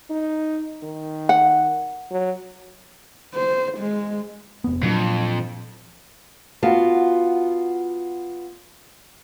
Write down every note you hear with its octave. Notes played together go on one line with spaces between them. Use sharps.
D#4
D#3
F#5
F#3
C5
G#3
F1 B3
F2 A#2 F#3 D4
B3 F4 F#4 F5 A5